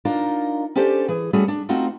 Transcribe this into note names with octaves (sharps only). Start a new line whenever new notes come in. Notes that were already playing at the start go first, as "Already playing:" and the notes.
D4 D#4 F4 A#4
C#4 D4 G4 A4 C5 D5
E3 G#4
G3 A3 C#4 F#4 G#4
D4
A3 C4 D#4 F4 F#4